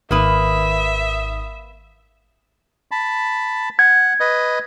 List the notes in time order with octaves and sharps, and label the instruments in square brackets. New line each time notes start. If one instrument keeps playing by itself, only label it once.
[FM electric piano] G#1 D#3 D#6 [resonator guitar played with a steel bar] A#3 B4 [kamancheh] E5
[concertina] A5 B5
[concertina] F#5 [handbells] G#6
[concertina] B4 D#5